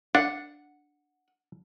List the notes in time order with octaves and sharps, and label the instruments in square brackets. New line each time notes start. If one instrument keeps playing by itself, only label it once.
[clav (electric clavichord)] D4 [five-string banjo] F#5